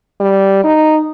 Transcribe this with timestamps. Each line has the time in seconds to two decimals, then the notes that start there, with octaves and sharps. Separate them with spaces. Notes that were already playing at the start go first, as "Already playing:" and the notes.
0.20 G3
0.64 D#4